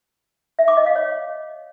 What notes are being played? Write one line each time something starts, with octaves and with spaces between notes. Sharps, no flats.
E5
D6
D#5
F5
C#5